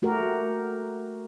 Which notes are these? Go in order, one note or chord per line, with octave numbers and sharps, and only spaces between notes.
A3 F#4 G4 A#4